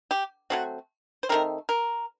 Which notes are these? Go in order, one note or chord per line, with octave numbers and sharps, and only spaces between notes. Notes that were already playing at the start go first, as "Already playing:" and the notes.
G4
F#3 A3 C4 F#4
C5
D#3 A3 C4 A#4
A#4